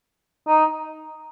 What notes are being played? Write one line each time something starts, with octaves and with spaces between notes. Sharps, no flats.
D#4